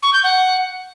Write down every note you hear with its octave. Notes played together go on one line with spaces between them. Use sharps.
C#6
G6
F#5